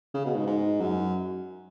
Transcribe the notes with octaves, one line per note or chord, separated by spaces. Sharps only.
C#3
B2
G#2
G#2
F#2